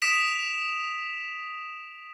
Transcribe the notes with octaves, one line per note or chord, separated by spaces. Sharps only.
D#6 B6 D7 E7 F7